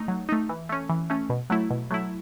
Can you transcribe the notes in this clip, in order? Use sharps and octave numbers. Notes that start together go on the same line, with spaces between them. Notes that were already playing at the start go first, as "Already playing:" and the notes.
Already playing: A3 D#4
F#3
A3 D#4
E3
A3 C#4
E3
A3 C#4
B2
F#3 A3 E4
B2
F#3 A3 E4